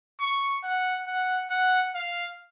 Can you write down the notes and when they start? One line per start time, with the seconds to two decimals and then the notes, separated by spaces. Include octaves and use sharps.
0.20 C#6
0.64 F#5
1.07 F#5
1.51 F#5
1.95 F5